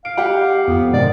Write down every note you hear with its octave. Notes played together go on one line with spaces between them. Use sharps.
F5 D7
G4 F#5
F2 B3
G#2 C3 D#3 D5